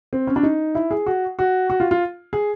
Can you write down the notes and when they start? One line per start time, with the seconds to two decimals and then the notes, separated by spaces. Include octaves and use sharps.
0.13 C4
0.27 C#4
0.36 D4
0.43 D#4
0.75 E4
0.91 G#4
1.06 F#4
1.39 F#4
1.70 F#4
1.80 F4
1.91 F4
2.33 G#4